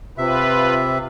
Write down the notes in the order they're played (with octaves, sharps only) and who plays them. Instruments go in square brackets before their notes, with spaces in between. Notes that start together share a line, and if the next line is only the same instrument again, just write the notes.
[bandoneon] C3 E5 [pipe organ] F4 B4